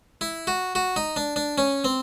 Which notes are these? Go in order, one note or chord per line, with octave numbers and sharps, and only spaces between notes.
E4
F#4
F#4
D#4
D4
D4
C#4
C4